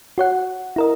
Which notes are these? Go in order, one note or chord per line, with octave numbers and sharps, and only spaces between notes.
F#4 C#5 F#5
E4 A#4 D#5